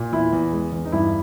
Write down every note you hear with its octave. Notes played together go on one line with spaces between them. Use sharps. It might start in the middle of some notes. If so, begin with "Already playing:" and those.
Already playing: A#2
E2 E4
E2
G#3
E2
D#4
G2 E4